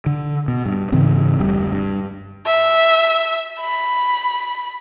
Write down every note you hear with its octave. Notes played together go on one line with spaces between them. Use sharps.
D3
B2
G2
G#2 C#3 E3 C4
F1 D2 G3
G2
E5
B5